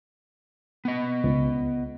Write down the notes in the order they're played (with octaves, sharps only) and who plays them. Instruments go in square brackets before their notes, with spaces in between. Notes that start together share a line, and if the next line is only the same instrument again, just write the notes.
[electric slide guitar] B3 D#5
[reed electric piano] C#2